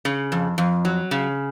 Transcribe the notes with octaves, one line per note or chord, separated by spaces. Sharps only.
C#3
F2
F2
F#3
C#3